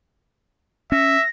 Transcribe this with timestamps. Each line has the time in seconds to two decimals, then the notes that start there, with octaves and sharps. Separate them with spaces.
0.92 C#4 E5 A#6